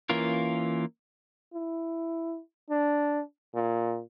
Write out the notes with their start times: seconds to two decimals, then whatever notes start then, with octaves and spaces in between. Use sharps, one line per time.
0.09 E3 A#3 C#4 F4 A#4
1.54 E4
2.70 D4
3.55 A#2